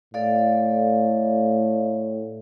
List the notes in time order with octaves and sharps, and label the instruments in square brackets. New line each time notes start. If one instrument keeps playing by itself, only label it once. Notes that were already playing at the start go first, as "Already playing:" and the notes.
[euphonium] A2 [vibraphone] A4 D5 F5